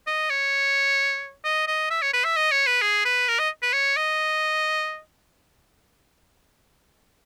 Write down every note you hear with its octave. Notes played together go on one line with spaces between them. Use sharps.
D#5
C#5
D#5
D#5
E5
C#5
B4
E5
D#5
C#5
B4
G#4
B4
A#4
D#5
B4
C#5
D#5